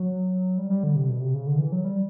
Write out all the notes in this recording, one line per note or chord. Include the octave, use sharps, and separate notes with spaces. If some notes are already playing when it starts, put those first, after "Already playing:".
Already playing: F#3
G3
G3
D3
C3
B2
C3
C#3
D3
E3
F#3
G3